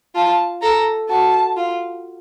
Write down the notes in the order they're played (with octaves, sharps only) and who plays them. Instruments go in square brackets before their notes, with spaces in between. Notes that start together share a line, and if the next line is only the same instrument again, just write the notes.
[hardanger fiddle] F4 [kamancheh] A5
[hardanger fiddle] A4 [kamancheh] A#5
[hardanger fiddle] F#4 [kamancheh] A5
[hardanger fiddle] F4